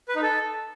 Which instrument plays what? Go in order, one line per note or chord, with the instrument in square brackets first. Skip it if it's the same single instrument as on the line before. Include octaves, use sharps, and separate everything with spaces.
[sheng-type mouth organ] B4
D#4
A4